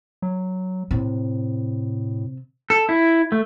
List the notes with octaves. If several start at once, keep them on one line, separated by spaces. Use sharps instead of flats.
F#3
A2 C3
A4
E4
A3